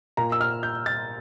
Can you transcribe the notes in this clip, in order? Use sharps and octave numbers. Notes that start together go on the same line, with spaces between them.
A#2 A#5
E6
F6
G6
A6